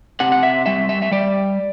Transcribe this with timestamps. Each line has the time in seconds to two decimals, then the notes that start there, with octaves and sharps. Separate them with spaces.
0.20 C3 F#5
0.32 F#5
0.43 E5
0.66 G3 E5
0.89 E5
1.02 E5
1.11 G3 D5